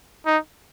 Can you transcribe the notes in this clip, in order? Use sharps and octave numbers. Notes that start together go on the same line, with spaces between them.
D#4